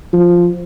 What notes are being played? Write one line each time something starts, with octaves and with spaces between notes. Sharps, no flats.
F3